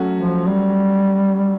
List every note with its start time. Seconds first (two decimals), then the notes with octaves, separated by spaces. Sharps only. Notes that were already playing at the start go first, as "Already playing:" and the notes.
Already playing: F#3 A3 C#4 F#4
0.18 F3
0.47 G3